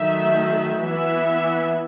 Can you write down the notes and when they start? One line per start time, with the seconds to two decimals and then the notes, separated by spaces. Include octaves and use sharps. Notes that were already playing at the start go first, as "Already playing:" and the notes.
Already playing: D#3 F#3 A3 E5
0.82 E3 B3 E5